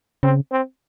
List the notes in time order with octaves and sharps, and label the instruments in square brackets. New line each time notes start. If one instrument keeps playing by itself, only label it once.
[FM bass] C#3 [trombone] C4
[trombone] C4